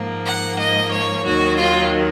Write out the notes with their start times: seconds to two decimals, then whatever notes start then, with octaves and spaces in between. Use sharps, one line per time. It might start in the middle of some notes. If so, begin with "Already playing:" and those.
Already playing: G#2 F3 A#3
0.26 F#5
0.58 D#5
0.91 C#5
1.24 D#2 D#3 F#3 F#4
1.57 F4